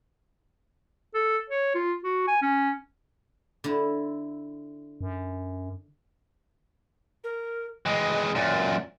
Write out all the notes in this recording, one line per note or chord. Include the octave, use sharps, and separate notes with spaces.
A4
C#5
F4
F#4
G#5
C#4
D3 E4
F#2
A#4
E3 G#3 D#5
F#2 A#2 D5